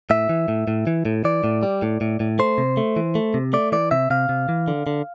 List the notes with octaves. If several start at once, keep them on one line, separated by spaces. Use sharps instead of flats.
A2 E5
E3
A2
A2
E3
A2
E3 D5
A2
G3
A2
A2
A2
A3 C5
C3
A3
E3
A3
C3
A3 D5
E3 D5
C3 E5
C3 F5
C3
E3
D3
D3